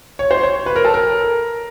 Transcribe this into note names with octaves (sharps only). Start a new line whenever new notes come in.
C#5
C5
C#5
B4
A#4
A4
A#4